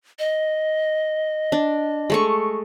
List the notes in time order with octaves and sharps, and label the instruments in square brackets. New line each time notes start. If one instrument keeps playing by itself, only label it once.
[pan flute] D#5
[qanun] D4
G#3 A3 C#6